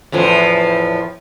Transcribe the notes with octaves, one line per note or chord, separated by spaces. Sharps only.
E2 A2 F3